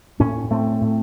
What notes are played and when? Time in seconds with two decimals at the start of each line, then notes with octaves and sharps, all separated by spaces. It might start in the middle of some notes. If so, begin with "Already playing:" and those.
0.20 A2 A#3 C#4
0.51 A2 A3 C4
0.81 A2